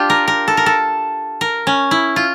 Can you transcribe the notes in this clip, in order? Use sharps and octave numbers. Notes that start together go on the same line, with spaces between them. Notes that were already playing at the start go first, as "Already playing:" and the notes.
Already playing: D4 F4 G4
A#4
A#4
A4
A#4
A4
A#4
C#4
E4
F4